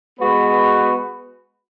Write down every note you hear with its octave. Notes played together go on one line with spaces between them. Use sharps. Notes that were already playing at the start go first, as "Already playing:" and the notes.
G#3 B3 F#4 B4